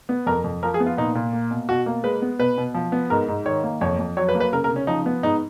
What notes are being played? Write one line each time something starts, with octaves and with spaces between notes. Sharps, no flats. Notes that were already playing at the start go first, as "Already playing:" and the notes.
B3
F2 A#4
F2
F3 A#4
G#4
B3
F4
A#2 D#4
A#2
A#3
B2
B2 F#4
A#3
G#3 B4
B3
B2 B4
B2
F3
B3
G#2 A#4
G#2
D#3 C#5
A#3
F2 C#5
F2
F#3 C#5
B4
A#3
B4
C#3 A#4
A#4
C#3
C#4
F3 D#4
B3
G#2 D#4